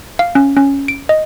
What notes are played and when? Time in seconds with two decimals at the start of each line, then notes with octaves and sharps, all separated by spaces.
0.19 F5
0.35 C#4
0.57 C#4
0.88 D7
1.09 D#5